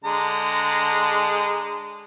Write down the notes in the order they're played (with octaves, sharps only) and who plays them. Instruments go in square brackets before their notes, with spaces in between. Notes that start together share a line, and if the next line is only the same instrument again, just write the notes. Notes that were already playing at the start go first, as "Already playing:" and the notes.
[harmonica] D3 G#3 A#5